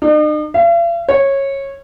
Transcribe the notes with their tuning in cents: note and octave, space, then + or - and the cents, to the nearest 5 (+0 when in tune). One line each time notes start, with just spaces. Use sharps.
D#4 -45
F5 -45
C#5 -15